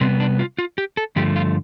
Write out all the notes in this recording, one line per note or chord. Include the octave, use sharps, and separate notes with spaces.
C3 G3 B3 C4
D4
F4
F4
G4
A4
G2 D3 F3 A3 G4
F4